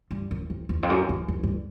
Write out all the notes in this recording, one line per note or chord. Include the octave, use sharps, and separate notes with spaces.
G2
F#2
F2
E2
F2
F#2
F2
F#2
G2